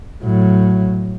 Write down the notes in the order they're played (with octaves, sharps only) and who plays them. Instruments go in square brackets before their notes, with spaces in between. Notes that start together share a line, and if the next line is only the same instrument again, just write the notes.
[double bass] A2 F#3